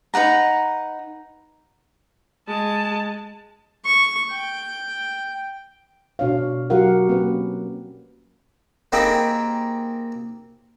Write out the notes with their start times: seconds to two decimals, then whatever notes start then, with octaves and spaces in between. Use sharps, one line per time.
0.14 D#4 B4 F#5 A#5
2.48 G#3 A5
3.85 C#6
4.32 G5
6.19 B2 D4 C#5 F5
6.70 F#3 F#4 G4 A#4 F5 F#5
7.09 A#3 C4 C#4 B4
8.92 A#3 C4 D#4 G4 G#4 B4